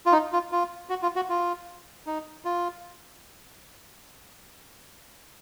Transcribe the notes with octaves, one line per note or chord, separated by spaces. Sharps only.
F4
D#4
F4
F4
F#4
F4
F#4
F4
D#4
F4